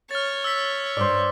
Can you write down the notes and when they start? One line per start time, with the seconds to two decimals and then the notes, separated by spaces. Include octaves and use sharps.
0.11 C#5 F6 A6
0.44 E6 B6
0.97 G2 C5 D5